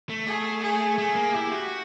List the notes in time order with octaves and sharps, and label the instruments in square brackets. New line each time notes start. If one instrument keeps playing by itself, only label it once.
[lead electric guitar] A3
[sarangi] G#4
G#4
[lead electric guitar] A3 [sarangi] G#4
[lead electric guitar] A#3
[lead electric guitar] E4 [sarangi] G4
[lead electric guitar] F#4